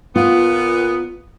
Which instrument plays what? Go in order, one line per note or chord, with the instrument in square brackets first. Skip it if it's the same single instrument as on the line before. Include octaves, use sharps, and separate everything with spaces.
[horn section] A#2 B3 [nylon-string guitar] F4